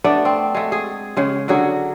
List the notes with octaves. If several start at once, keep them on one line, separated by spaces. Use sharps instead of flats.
A3 B3 D4 D5
C4
G#3 A3
G#4
C#3 G#3
D3 F#3 F#4 G#4